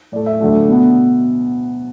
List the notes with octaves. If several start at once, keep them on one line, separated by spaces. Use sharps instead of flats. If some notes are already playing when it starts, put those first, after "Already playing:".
A2 A3 D5
E5
D2 D3 F#3 A3
B2 B3